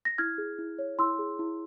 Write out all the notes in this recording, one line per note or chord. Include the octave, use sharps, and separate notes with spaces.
A#6
E4 F6 G#6
G#4
E4
C#5
E4 C6 E6
G#4
E4